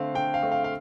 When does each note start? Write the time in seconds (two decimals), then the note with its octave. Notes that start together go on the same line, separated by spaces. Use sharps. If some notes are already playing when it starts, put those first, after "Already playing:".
Already playing: D3 A3 C4 F5
0.14 D3 G5
0.34 F5
0.43 A3 C4
0.52 F5
0.64 F5